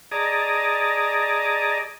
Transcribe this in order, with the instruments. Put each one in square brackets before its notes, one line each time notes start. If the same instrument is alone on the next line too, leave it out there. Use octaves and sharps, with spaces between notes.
[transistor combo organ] G#4 D5 D#5 A5 A#5